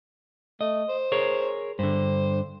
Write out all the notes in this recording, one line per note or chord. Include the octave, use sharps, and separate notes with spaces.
A3 D#5
C5
G#4 A#4 C#5
G2 D3 C5